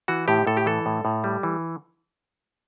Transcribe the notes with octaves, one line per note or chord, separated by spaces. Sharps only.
E3 F#4
A2 G4
A2 A4
G4
E3 A4
A2
A2
G3
E3